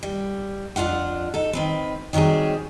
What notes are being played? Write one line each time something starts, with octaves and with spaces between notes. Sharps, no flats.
G3
F2 D4 F4 F5 F#5
D#4 A4
D#3 C4 B4
D#3 F#3 G3 C4 G#4